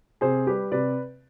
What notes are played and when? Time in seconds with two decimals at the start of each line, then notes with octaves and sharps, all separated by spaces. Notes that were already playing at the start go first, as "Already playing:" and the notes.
0.21 C3 G#4 C5
0.47 G3 G4 B4
0.72 C3 B4 D5